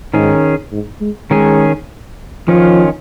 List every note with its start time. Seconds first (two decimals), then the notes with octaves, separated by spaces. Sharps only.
0.14 G#2 D#3 C#4 G#4
0.72 G#2
1.01 G#3
1.31 D#3 G#3 C#4 G#4
2.48 D#3 F3 C#4 F4